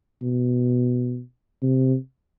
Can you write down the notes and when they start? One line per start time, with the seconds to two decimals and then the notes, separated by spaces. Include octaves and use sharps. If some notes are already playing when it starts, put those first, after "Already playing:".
0.22 B2
1.62 C3